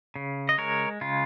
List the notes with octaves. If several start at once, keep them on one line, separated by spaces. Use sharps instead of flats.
C#3
D#5
G#3 A#4 C#5
C#3 F4